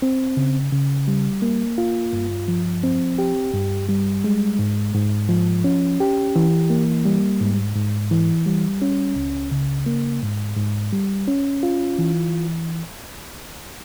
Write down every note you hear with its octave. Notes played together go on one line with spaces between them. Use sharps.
C4
C#3
C#3
G3
A#3
F4
G2
F3
C4
G4
G2
G3
G#3
G#2
G#2
F3
C#4
G4
E3
A#3
G3
G#2
G#2
E3
G3
C#4
C#2
C#3
A#3
G#2
G#2
G3
C#4
F4
E3